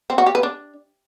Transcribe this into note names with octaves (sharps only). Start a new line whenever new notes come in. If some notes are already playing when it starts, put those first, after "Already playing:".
C4
F#4
G4
B4
D4